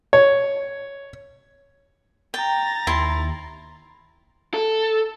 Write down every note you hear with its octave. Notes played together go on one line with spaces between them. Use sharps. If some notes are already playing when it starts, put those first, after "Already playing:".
C#5
G5 A#5 A6
D#2 E4 C6
A4